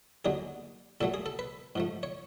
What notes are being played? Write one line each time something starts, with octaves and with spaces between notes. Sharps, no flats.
D#2 D3 F#3 G#4
A#2 F#3 A3 A4
G#4
A4
B4
G#2 F3 A3
C#5